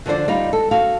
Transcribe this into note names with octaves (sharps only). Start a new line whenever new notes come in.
D3 F3 D4 C5 D5
G3 D#4 F4
A4
F#4 A4 F5